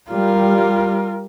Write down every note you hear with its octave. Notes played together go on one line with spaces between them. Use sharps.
G3 F4 A#4